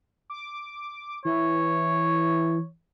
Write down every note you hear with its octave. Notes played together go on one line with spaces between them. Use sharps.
D6
E3 C#5